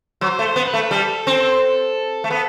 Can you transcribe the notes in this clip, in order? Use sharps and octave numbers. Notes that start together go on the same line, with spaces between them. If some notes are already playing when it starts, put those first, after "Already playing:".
F#3 C5
A3
C5
B3
B4
A3
G3 A4
C4
A3
B3